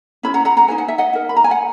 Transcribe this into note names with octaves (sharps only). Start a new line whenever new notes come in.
C#4 E4 B4 B5
F#5 A#5
F#5 A#5
F#5 A#5
D#4 G#4 B4 G#5
F#5
E5
D#5 F#5
D#4 A#4
B5
A#5
G#5
F#5